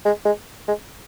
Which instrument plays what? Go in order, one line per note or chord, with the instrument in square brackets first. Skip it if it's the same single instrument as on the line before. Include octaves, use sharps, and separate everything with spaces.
[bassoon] G#3
G#3
G#3